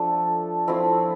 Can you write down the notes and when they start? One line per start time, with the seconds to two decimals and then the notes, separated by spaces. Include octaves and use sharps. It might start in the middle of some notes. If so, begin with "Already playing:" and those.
Already playing: F3 A3 D4 A4
0.68 F3 A3 C4 E4